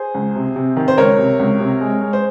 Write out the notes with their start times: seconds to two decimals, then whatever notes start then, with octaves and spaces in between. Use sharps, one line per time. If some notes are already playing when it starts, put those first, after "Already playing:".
Already playing: G#4 C5
0.14 C#2
0.35 C3
0.56 C3
0.77 D#3
0.88 C5
0.98 C#2 A#4 C#5
1.18 C3
1.39 C#2
1.60 C3
1.81 G#3
2.02 G#3
2.13 C5